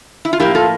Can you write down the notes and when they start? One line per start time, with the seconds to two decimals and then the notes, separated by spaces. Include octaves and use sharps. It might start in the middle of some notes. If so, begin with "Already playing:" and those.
0.25 E4
0.33 F4
0.40 A2 F3 A#3 E4 G4
0.55 F4 A4